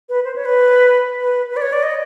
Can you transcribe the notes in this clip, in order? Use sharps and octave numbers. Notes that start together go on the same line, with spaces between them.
B4
C5
C#5
B4
B4
B4
D5
C#5
D5
D#5